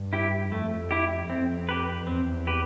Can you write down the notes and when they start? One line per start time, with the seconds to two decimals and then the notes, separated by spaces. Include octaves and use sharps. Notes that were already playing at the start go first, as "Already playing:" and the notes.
Already playing: G2
0.13 E4 G4
0.52 F2 A3
0.91 E4 G4
1.29 F2 C4
1.69 G4 B4
2.07 E2 C4
2.47 G4 B4